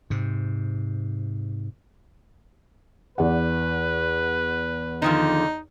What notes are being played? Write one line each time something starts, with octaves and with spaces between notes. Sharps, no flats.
G#2 C3
E2 B4 D5 F#5
D3 D#3 F3 D#4